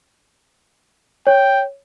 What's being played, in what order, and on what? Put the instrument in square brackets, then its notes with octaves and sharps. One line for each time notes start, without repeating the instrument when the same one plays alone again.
[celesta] C#5 [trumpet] G5